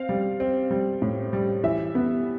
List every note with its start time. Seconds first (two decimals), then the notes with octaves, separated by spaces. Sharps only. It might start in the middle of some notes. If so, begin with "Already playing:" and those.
Already playing: C4 F5
0.09 G3
0.40 C4
0.71 G3
1.02 A2
1.33 G3
1.64 E3 E5
1.95 B3